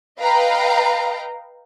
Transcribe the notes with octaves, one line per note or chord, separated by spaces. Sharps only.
B4 D#5 F5 G5 A#5